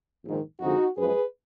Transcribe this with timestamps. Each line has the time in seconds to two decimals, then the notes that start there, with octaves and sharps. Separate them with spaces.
0.25 A#1 G#2 D#3
0.61 F2 D3 F3 G#3 D#4 F#4
0.97 F#2 F3 G#3 G#4 B4